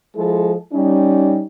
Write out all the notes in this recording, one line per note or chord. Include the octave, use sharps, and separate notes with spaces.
F3 G#3 E4 A4
G3 C#4 D#4